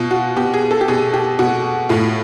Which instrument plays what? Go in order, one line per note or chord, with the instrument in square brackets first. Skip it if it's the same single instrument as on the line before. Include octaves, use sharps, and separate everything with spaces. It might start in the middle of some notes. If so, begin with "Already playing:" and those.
Already playing: [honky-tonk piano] B2 F4
F#4
B2 G4
G#4
A4
G4
B2 G#4
G4
B2 F#4
A2 F4